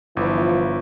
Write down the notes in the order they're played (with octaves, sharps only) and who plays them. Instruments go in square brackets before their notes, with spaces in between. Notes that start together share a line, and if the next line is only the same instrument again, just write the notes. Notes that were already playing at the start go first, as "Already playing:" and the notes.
[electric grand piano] G1 E4 [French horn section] E3 F3